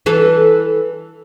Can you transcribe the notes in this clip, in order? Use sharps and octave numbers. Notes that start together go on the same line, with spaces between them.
E3 A4